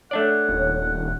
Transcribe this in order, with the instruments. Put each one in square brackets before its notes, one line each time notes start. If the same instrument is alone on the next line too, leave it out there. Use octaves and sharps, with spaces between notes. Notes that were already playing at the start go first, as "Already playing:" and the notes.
[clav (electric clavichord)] A3 D4 D5 [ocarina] C#5 [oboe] F#5
[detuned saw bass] D#1